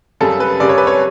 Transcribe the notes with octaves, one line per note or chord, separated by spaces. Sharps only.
F#2 C#3 G3 A4
B4
F#2 C#3 G3 D5
C#5
B4
C#5